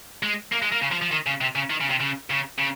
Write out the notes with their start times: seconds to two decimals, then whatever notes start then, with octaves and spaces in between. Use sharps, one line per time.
0.23 G#3
0.52 A#3
0.62 G#3
0.72 A#3
0.82 C#3
0.91 F3
1.01 F3
1.11 D#3
1.26 C#3
1.41 C3
1.55 C#3
1.70 D#3
1.80 C#3
1.90 C3
2.00 C#3
2.30 C#3
2.59 C#3